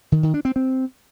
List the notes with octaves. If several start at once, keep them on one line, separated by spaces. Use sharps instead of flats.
D#3
D#3
D4
C4
C4